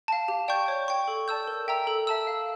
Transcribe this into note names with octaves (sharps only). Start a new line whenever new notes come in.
F5 A5
G4
D5 G5 C#6 G6
C#5
G5 C#6
A4
D5 A5 E6 G6
A#4
E5 G5 A#5 E6
A4
E5 A5 E6
F5